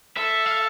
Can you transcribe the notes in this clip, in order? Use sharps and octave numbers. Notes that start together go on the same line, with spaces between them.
A4 E5
F5